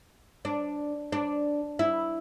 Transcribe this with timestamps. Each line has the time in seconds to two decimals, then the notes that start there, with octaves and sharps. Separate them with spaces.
0.45 D4
1.12 D4
1.79 E4